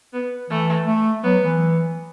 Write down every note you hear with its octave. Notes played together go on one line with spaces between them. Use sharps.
B3
E3 A3
A3
F#3 B3
E3